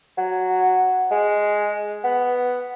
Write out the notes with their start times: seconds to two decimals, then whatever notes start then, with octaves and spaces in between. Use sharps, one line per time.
0.18 F#3
1.11 G#3
2.04 B3